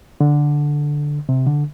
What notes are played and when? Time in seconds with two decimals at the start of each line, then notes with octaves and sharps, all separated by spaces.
0.21 D3
1.29 C3
1.47 D3